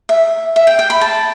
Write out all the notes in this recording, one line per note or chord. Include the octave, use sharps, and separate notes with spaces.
E5
E5
G5
G5
B5
A5